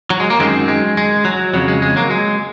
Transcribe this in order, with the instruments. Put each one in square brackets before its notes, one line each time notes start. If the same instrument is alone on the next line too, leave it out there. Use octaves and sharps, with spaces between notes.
[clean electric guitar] F#3
G#3
A#3
F#2 D#3 G#3 C4
G#3
G#3
F#3
F2 C#3 F#3
G#3
G#3
F#3 A#3
G#3